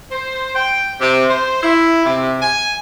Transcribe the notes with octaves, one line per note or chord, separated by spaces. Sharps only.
C5
G5
C3
C5
E4
C3
G#5